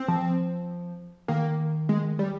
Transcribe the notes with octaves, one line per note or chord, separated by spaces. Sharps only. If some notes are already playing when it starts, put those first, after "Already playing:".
Already playing: C4
F3
D#3 A#3
G#3
G3